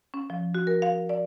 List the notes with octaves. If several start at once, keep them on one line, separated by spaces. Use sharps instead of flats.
C#4
F3
F#4
A#4
F5
D5